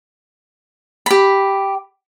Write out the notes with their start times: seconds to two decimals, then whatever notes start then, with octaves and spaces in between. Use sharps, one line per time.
1.06 G4 B5